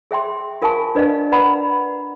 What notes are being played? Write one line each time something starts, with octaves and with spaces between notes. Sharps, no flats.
G#4 E5 G5 C6
F4 A#4 F5 G#5 A5 C#6
D4 B4 D5 D#5 F5
B4 D5 F#5 A#5 B5